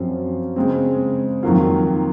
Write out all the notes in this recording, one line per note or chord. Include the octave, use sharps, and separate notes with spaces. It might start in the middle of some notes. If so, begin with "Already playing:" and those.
Already playing: F#2 F3 C4 F4
C#3 G#3 C4
F2 D#3 F#3 A#3 F4